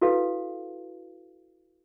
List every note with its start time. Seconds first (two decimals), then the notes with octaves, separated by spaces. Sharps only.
0.01 E4 F#4 A4 B4 F5